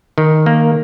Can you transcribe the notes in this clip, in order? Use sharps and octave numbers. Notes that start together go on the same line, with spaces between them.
D#3
A#3